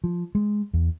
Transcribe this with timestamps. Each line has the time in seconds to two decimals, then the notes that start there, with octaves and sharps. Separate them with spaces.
0.04 F3
0.35 G#3
0.73 E2